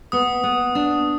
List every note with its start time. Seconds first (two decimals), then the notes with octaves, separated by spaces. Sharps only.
0.12 B3 D#6
0.44 B3
0.75 D4